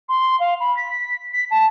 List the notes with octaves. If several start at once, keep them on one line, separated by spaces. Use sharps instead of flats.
C6
F5
B5
B6
B6
A5